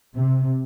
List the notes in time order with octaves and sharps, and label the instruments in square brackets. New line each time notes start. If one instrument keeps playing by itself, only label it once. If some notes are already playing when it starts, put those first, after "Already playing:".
[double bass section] C3